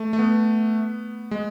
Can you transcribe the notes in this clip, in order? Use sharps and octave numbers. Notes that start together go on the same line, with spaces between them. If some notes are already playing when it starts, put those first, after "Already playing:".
Already playing: A3
A3
B3
G#3